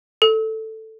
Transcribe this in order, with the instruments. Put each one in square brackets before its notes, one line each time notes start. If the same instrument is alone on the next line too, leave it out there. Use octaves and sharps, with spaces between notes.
[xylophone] A4